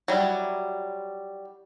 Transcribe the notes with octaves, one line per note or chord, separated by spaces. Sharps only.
F#3 G3 E4